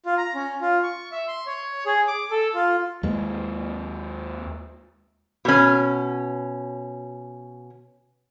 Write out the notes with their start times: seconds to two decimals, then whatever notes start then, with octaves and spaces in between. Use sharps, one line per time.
0.06 F4
0.18 A#5
0.35 C#4
0.61 F4
0.83 C#6
1.12 E5
1.28 C6
1.47 C#5
1.86 G#4
2.08 D6
2.31 A4
2.54 F4
3.03 D#2 G#3
5.45 B2 C#4